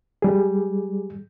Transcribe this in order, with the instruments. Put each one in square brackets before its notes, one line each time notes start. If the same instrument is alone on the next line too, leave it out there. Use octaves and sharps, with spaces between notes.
[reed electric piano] G3 G#4